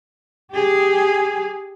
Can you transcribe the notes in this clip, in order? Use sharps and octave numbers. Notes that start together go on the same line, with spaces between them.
G4 G#4